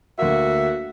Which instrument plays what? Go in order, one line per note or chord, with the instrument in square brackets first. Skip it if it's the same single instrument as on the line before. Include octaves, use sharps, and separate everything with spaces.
[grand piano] D2 A#3 [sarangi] F#4 [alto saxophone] E5